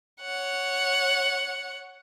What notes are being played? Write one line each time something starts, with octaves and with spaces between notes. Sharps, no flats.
C#5 F#5